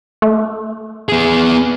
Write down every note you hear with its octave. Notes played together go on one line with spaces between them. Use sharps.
A3
B3 G#4